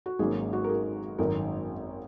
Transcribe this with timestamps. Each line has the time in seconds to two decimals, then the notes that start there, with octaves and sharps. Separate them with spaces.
0.06 F#4
0.19 G#1 G#2 F#3 A#3 C#4 G#4
0.53 F#4
0.64 A#4
0.69 G#4
1.18 G#1 F#2 D#3 A#4